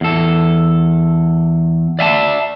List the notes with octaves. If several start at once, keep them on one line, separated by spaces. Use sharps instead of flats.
E2 A4
D5 E5 G#5 A5